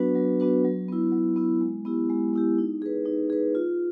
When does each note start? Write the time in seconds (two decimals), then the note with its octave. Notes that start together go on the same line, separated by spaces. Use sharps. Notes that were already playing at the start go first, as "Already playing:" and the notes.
Already playing: F#3 B3 D4 F#4 B4
0.15 F#3
0.40 B3 D4 F#4 B4
0.65 F#3
0.89 B3 E4
1.12 F#3
1.36 B3 E4
1.61 G#3
1.85 B3 E4 G4
2.10 G#3
2.33 B3 E4 G4
2.58 D#4
2.82 G#4 B4
3.06 D#4
3.30 G#4 B4
3.55 F4